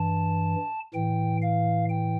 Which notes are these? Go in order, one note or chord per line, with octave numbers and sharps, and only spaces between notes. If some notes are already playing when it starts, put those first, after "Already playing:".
Already playing: G2 E3 A5
A2 E3 G5
F5
G5